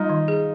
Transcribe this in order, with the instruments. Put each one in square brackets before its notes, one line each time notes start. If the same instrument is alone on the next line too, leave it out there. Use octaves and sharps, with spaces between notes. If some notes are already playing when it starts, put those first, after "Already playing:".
Already playing: [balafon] G3 [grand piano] D#4 F4
[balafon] D#3
G#4